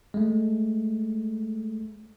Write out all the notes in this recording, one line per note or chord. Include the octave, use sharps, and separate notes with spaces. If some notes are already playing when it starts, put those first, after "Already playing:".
G#3 A3